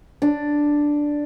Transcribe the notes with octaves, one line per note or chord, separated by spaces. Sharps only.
D4